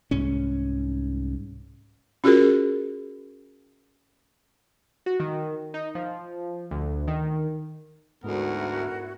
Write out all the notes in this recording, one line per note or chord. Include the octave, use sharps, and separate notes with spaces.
C2 G#2 C#4
C#4 F4 F#4 G#4 A#4
F#4
D#3
D#4
F3
D2
D#3
D2 G#2 B3 E4 F#4 A#4